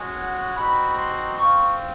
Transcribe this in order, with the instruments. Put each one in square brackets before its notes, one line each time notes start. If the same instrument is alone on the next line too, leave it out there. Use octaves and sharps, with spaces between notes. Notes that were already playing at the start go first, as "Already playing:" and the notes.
Already playing: [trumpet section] G#3 C#4 F#4
F#5
C4 D#4 F#4 B5
C6
C4 F4 C#6